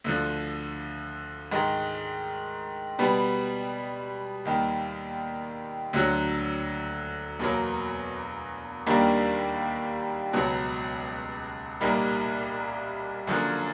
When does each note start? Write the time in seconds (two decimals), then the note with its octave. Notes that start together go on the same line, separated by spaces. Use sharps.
0.04 D2 D3 F3
1.51 G#2 D#3 G#3
2.99 B2 G3 B3
4.45 D#2 D#3 G3
5.93 D2 D3 F#3
7.40 E2 B2 F#3 A#3
8.86 D#2 D#3 G3 A#3 D4
10.33 C#2 B2 F#3
11.81 C2 A#2 G3 A#3 D#4
13.27 F#2 D3 F3 A#3